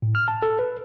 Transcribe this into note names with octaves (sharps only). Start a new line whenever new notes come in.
A2
F6
A5
A4
B4